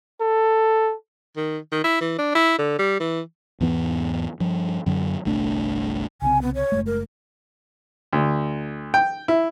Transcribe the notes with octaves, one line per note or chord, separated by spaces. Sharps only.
A4
D#3
D#3
E4
E3
D4
E4
D3
G3
E3
E2 G#2 E3 B3
G2 F3
F#2 D3 F#3
G1 C2 A3 D4
C2 C#3 C4 G#5
B3
C#5
F#1 G#3 A3
A#4
D2
G5
E4